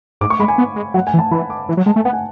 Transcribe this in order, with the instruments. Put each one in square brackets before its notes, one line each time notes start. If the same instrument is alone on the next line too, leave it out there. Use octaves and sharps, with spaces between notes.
[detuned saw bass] G#2 [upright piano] D6
[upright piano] C#6
[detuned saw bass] G#3 [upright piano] B5
[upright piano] G#5
[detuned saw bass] B3
G#3
[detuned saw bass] F#3 [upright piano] F#5
[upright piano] G#5
[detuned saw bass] E3
[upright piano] A5
[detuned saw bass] E3 [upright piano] B5
[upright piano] D6
[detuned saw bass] E3
F#3
[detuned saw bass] G#3 [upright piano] A5
[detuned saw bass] A3 [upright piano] G#5
[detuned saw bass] B3 [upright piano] F#5
[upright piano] G#5